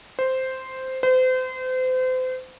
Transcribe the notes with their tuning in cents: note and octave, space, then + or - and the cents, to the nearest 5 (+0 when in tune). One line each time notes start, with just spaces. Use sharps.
C5 -5
C5 -35